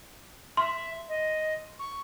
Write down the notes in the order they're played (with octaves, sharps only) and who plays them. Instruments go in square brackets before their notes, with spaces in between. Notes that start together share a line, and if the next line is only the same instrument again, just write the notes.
[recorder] E5 [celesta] C6
[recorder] D#5
C#6